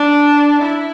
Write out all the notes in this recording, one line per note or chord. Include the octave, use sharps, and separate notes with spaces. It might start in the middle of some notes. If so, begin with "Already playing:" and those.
Already playing: D4
E4